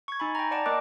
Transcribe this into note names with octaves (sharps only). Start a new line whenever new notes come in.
C#6 G#6
D#4 G#5 B5
G5 A#5
D5 F#5 G5 A5
A#3 A#4 D#5 D6 F#6